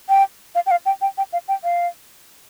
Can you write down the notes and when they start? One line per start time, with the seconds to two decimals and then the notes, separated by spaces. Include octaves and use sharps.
0.09 G5
0.55 F5
0.66 G5
0.71 F5
0.86 G5
1.02 G5
1.18 G5
1.33 F5
1.48 G5
1.64 F5